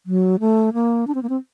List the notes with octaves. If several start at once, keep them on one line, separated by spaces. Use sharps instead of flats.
F#3
A3
A#3
D4
C4
A#3
C4